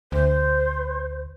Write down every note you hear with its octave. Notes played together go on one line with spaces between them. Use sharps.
D2 C5